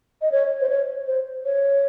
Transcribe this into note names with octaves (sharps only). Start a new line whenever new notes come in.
D#5
C#5
C5
C#5
C5
C#5